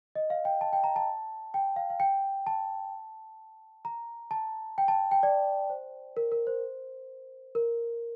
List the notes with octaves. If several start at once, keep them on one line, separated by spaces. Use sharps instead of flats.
D#5
F5
G5
A5
G5
A#5
A5
G5
F5
F5
G5
A5
A#5
A5
G5
A5
G5
D5
C5
A#4
A#4
C5
A#4